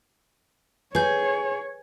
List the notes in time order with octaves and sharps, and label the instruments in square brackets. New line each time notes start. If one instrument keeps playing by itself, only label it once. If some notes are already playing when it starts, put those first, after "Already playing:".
[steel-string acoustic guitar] G#4 [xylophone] B4 G6 [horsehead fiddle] C#5